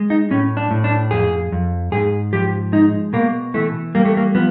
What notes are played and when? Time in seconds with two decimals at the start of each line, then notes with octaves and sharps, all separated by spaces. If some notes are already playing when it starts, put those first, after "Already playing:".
Already playing: G#3
0.10 D#4
0.31 A2 C#4
0.57 D4
0.71 A2
0.84 D4
1.11 F2 G#4
1.52 F2
1.92 G#2 G#4
2.33 F3 G4
2.72 G#3 D#4
3.13 B2 A#3
3.54 E3 A3
3.95 G3 A#3
4.05 A3
4.17 A#3
4.35 F3 B3